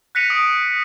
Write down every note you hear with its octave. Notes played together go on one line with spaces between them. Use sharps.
F#6 A#6 B6 C#7 D#7 F7
D#6 D7